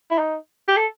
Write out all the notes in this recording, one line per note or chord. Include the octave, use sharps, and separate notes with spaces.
E4
D#4
G4
A4